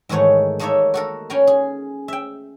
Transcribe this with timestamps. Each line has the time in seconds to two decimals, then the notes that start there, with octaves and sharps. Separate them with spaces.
0.09 G#2 D#3 E3 A3 C#5 F#5
0.59 A3 A#3 D#4 A4 C#5 E5
0.94 F#4 A4 A#4
1.30 C#4 G5 G#5 A#5 B5
1.47 G#4
2.08 E5 G5